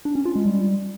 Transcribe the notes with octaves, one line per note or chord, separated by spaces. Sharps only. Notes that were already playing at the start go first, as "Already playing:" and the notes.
D4
C#4
F4
G#3
G3